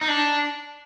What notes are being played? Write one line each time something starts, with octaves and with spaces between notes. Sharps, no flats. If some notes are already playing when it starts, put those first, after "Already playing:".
D#4
D4